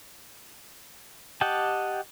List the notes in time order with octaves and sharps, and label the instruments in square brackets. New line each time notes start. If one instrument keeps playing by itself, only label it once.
[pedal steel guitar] G4 D#5 F#5 G5 A5